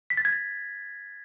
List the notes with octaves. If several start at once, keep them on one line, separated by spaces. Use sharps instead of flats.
B6
A6
G#6
A6